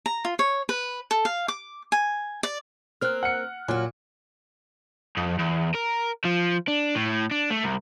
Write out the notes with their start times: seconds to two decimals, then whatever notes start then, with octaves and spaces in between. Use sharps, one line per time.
0.06 A#5
0.25 F4
0.39 C#5
0.69 B4
1.11 A4
1.25 F5
1.48 D6
1.92 G#5
2.43 D5
3.01 A#3 C4 A#4 F6 F#6
3.23 F#5 C#7
3.68 A#2 F#3 F#4
5.17 F2
5.39 E2
5.75 A#4
6.25 F3
6.68 D4
6.95 A2
7.31 D4
7.50 A3
7.64 C2